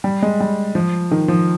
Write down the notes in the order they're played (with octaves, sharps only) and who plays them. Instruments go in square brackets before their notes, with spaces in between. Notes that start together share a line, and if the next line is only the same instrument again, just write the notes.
[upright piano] G3
G#3
G3
F3
D#3
F3